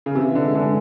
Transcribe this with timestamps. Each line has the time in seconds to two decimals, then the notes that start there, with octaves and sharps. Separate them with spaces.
0.06 C#3
0.15 C3 E3
0.30 E3
0.35 D3
0.45 G#3
0.55 D3
0.59 G#3